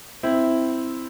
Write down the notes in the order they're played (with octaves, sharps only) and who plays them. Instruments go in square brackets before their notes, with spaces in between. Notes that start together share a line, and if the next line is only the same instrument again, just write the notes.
[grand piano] C4 E4